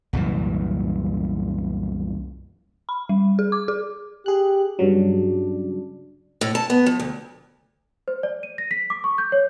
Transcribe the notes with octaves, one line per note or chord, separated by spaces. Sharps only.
C2 F#2 A#2 E3
B5
G3
G#4
D6
G#4
G4 G#4 F#6
G2 C#3 F#3 D4
A2
A5
B3
F3
D2
C5
D5
D#7
A#6
B6
D6
C#6
G6
C#5